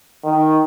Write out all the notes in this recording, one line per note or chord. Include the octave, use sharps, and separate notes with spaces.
D#3